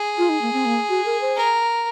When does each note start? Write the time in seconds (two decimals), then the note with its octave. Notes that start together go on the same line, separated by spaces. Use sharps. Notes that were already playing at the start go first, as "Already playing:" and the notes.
Already playing: G#4
0.18 F4
0.29 D#4
0.42 A#3
0.53 C4
0.65 A#3
0.89 F#4
1.05 A#4
1.21 C5
1.37 A#4